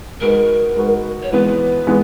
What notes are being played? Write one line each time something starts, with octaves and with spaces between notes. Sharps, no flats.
G#3 D#4 F#4 A#4 B4
G#3 D#4 F#4 B4
C#5
E3 G#3 B3 B4
E3 G#3 B3